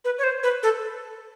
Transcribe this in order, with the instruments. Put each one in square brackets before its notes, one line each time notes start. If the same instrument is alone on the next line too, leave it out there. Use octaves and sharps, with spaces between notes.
[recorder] B4
C#5
C5
B4
A4